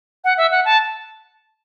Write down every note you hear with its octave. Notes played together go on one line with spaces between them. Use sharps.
F#5
E5
F#5
A5